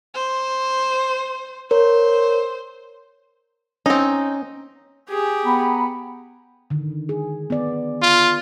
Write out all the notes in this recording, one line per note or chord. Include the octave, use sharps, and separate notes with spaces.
C5
A#4 C5 C#5
C4 C#4 D#4
G4 G#4
B3 G5 A#5 B5
D3 D#3
G#4
B3 D5
F4